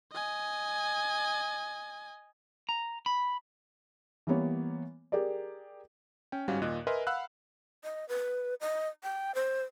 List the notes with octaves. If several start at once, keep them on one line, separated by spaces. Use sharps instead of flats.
D#5 G#5
A#5
B5
E3 G3 A#3 B3 C#5
G4 G#4 A#4 D5
C#4 G5
G1 G#2 G3 C#4 F#4 F5
D#2 A#2 D#5 F#6
A#4 B4 D#5 E5 G#5 C6
F5 F#5 B5 E6 F#6
D#5
B4
D#5
G5
C5